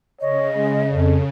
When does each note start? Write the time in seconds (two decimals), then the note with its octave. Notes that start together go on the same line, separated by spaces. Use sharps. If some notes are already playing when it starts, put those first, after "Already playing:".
0.21 C#3 C#5 D#5
0.56 G#3
0.92 F2 A4